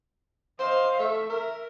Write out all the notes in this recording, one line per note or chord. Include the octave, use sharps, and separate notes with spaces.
C5 D#5 F5
A3 E5
A#4